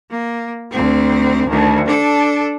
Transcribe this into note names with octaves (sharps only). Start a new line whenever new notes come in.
A#3
D2 C4
D2 D#3
D4 A4